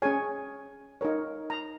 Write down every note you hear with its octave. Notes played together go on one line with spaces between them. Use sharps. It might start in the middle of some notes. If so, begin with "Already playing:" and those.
C#4 G#4 C#5 G#5
D#4 A#4 C#5
A#5